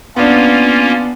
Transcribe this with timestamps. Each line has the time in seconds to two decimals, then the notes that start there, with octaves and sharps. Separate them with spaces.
0.16 A#3 B3 C#4 D4 F4